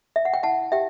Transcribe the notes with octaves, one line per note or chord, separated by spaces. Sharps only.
E5
F#5
G5
E4 F#5 A5
G4 E5 G5